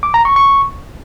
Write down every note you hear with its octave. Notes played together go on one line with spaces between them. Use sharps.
D6
A#5
C#6
C#6